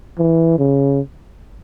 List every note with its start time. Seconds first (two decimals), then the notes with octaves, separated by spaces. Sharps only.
0.18 E3
0.58 C#3